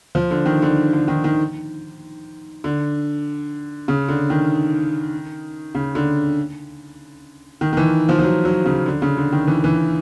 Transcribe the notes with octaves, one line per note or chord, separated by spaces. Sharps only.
F3
D3
D#3
D3
D3
D#3
D#3
D3
C#3
D3
D#3
C#3
D3
D#3
D#3
E3
F3
F3
F#3
F#3
C#3
D3
C#3
D3
D#3
E3
E3